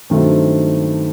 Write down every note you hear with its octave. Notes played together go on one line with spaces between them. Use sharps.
G2 D#3 F#3 A3 C4